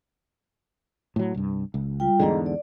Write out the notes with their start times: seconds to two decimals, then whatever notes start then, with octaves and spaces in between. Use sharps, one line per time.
1.16 A2 F#3
1.34 C2 G2
1.74 C#2
2.00 G3 F4 G5
2.20 E2 G#2 D3 G#4 D#5 A#5
2.46 D5